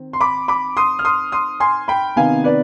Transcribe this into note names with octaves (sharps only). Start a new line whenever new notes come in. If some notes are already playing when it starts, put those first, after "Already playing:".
Already playing: D#3 C4
C6
B5 D6
B5 D6
C6 D#6
F6
C6 D#6
C6 D#6
G#5 C6
G5 B5
C3 D#3 B3 D#4 F5 G#5
B4 D5